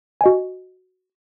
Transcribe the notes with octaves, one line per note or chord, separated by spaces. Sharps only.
F#4 D#5 G#5